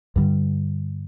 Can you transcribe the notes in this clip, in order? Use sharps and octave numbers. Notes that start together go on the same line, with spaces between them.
G2 D3 G3